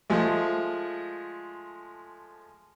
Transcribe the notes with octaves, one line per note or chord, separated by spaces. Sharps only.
F3 G#3 A3